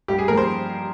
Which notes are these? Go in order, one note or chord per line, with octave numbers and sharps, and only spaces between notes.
G2 G4
G#4
F3 A#3 A#4
C5